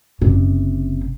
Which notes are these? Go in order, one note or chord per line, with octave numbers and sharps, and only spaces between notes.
F#1 C3